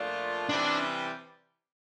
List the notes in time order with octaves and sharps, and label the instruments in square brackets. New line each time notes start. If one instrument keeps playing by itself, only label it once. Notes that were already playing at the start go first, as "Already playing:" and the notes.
Already playing: [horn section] A#2 F3 A3 D4 F4
[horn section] C3 E3 G3 [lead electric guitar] D4